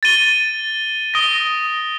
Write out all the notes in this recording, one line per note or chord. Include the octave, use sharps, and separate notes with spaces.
A6 D#7 G7
D#6 A#6 D7 G7